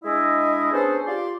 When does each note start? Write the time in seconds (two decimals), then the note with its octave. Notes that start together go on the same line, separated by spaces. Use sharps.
0.04 G#3 D4 E4 D#5
0.72 B3 C#4 D4 G#4 A4 C5
1.07 F4 G4 D5 C6